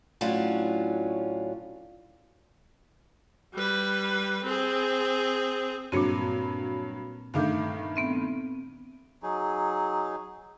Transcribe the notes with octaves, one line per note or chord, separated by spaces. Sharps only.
A2 F#3 C#4 D4 F4
G3 B4
C4 G#4
G2 A#2 F#3 A#3 C4
G2 D#3 A3 F5 D6 G6
B3 C4 E5
F#3 D#4 G#4